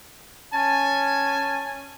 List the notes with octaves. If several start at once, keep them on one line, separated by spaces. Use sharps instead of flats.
C#4 G#5 A5